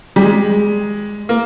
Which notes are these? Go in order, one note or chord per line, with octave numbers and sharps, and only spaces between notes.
G3
G#3
A#3